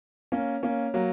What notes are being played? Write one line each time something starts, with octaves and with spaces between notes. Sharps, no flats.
A#3 C#4
A#3 C#4
F#3 A#3